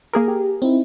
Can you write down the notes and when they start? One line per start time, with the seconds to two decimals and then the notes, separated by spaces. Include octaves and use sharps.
0.13 A#3 G#4 A#4
0.28 G4
0.62 C4 D#4 E4